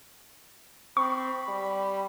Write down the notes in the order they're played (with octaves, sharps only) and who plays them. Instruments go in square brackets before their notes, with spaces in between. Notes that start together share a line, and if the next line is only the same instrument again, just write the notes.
[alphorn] C4 [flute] B5 [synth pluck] C#6
[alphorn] G3